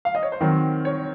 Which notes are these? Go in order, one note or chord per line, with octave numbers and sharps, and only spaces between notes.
F5
D#5
C#5
C5
D#3 F#3 C4 A#4
C#5